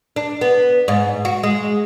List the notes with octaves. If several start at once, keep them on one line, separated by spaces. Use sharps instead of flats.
D4
B3
G#2
F#4
G#3